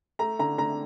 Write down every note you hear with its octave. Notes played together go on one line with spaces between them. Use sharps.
A3 A#5
D3 A#5
D3 A#5